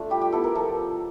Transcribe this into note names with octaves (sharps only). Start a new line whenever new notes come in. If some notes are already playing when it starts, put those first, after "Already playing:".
Already playing: A3 D4 F4
G3 G4
G4
B3 E4 A4
A#4
F3 A4